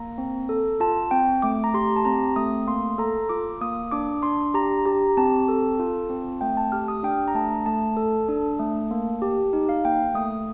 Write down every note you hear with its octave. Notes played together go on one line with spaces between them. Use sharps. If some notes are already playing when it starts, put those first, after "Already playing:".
Already playing: A#3 A#5
C4
A4
F4 A5
C4 G5
A3 D6
A#5
G4 C6
A5
C4 A#5
A3 D#6
A#3 C6
A4 A#5
F4 D6
A#3 D#6
D4 D6
D4 C6
G4 A#5
G4 A#5
C4 A5
A4
F4
C4
A3 G5
A5
G4 F6
D#6
D4 G5
A#5
A3 A5
A3 A5
A4
D4
A3
A#3
G4
D#4
F5
A#3 G5
A3 D#6